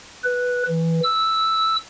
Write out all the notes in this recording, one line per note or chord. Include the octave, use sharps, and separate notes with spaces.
B4
E3
E6